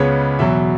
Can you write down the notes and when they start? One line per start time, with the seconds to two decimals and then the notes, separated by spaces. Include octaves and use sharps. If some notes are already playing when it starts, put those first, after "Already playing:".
Already playing: C#2 C#3 G#3 B3 B4 C#5
0.39 E2 B2 F#3 E5